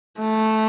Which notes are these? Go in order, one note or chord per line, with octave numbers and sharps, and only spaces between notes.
A3